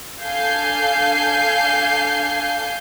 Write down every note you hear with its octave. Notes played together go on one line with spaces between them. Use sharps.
D4 A4 F5 G#5 G6 C7